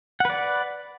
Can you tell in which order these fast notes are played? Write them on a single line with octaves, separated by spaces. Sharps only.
F#5 B4 D5